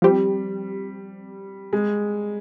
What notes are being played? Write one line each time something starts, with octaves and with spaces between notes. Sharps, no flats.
F3 G3 C4 G4
G#3